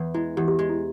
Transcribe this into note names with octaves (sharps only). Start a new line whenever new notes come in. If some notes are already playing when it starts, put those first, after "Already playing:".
Already playing: E2 E3
G#3 E4
E2 G4
G4
G#3 G4
E4